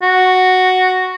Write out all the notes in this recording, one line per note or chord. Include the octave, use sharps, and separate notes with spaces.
F#4